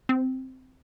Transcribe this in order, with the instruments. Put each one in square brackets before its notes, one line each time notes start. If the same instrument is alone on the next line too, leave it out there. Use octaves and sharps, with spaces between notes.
[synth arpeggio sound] C4